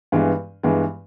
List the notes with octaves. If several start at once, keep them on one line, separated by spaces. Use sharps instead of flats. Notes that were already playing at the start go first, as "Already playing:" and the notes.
G2 E3 G#3 B3
G2 E3 G#3 B3